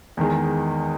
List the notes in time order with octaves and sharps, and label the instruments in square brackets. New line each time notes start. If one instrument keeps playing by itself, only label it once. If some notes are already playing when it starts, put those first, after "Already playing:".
[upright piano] E2 D#3 G#3